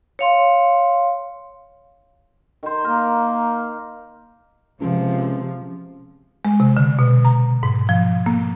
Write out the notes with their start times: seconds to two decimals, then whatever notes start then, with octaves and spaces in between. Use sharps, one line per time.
0.19 C#5 F5 C6
2.63 D#3 C5
2.84 A#3 A#4
4.81 C#2 C3 F3
6.45 G#3
6.60 C3
6.77 D3
6.99 B2
7.25 A#5
7.63 G#2
7.89 F3
8.26 A#3